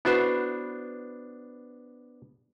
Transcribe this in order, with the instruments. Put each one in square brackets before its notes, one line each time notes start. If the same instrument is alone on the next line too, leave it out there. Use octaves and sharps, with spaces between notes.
[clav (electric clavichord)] B3 D4 C5 [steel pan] E4 F#4 B4